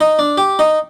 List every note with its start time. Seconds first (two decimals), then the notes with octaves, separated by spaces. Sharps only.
0.01 D#4
0.19 D4
0.38 G4
0.59 D#4